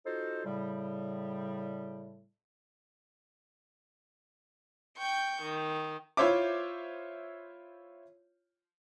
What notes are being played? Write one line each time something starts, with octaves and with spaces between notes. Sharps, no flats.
D#4 F4 F#4 A4 C5
A2 C#3 G3
G5 C#6 G6
D#3
E4 F4 C5 C#5 E5 D6